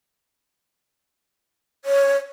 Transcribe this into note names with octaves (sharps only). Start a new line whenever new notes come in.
C#5